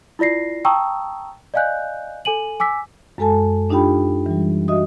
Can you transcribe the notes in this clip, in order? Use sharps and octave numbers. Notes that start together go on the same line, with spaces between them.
E4 F4 D5 A#6 C7
G5 A5 A#5 C#6 D#6 E6
D5 D#5 F5 G#5 F#6 G6
A4 G#5 D#7 F#7
G#5 D6 E6 B6
F#2 G#3 A4 G#5 A5
D4 D#4 F4 G4 G5 B5
E3 G3
F#4 D#5 E5 D#6